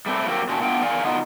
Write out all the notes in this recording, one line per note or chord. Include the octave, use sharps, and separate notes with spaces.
G3 A3 C4 E4
F#3 A#3 C4 G4
A#2 D3 C#4 F#4 G4 A5
A3 B3 D4 F4 G5
E2 D#3 D5 F5 G#5
D3 B3 D#4 F4 F#4 D#5